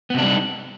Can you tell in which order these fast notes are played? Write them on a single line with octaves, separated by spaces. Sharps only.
B3 C3 D4 G3 D#4